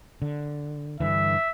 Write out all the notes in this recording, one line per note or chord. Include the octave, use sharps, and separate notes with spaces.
D3
G2 D3 E3 E5